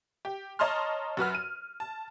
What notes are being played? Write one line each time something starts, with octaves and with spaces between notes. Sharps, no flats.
G4
C#5 D#5 A5 A#5 C6 F6
F#2 F#4 B4 F6
D#7
A5